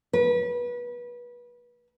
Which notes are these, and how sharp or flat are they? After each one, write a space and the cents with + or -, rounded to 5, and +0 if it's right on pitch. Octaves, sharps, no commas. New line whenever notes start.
B4 -30